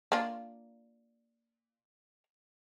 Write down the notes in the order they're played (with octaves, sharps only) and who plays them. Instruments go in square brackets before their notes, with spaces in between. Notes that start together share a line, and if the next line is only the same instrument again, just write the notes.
[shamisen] A#3 D4 F4